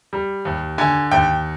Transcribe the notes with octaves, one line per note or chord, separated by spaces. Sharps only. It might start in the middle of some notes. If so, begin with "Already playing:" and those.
G3
D#2
D3 G#5
D#2 G5